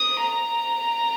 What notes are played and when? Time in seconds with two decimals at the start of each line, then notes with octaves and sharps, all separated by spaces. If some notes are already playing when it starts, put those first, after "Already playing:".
Already playing: D#6
0.24 A#5